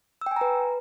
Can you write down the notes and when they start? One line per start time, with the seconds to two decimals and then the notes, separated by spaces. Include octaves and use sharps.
0.21 E6
0.26 G5
0.31 G#5
0.36 A#5
0.41 B4